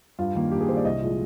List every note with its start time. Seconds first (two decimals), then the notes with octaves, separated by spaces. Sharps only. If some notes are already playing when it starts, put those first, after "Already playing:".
0.19 G2 F4
0.35 D#3 A#3
0.51 G2 G4
0.61 G#4
0.69 D#3 A#3 C5
0.77 D5
0.85 C2 D#5
1.02 A#2 F3 G#3